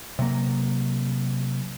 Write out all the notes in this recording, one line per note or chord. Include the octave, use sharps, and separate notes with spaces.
C3 F#3 A#3